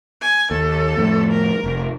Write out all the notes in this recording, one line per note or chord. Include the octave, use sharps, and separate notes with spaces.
G#5
D#2 A4
F2 A2
A#4
F1